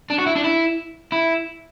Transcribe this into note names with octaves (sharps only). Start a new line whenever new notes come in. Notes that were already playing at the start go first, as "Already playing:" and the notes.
D4
F#4
E4
D4
E4
E4